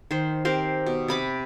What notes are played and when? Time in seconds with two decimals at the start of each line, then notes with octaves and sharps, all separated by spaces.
0.11 D#3 C5
0.45 C4 G4 A#4 C5
0.86 B2
1.08 C3 B5 D6